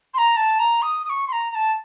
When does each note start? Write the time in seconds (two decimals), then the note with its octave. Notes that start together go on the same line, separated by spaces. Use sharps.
0.13 C6
0.17 A#5
0.36 A5
0.58 A#5
0.82 D#6
1.04 D#6
1.09 C#6
1.27 C6
1.32 A#5
1.50 A#5
1.54 A5